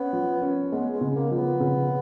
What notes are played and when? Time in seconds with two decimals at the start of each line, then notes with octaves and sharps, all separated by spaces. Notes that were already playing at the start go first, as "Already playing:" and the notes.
Already playing: B3 C#4
0.13 F3
0.42 C#4
0.72 G#3 B3
0.94 G#3
1.01 C#3
1.16 A#3
1.31 F3
1.37 B3
1.60 C#3